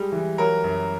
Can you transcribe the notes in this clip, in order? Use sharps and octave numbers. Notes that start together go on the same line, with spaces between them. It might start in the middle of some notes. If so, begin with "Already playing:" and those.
Already playing: G3 G#3
E3
F#3 A#4
F#2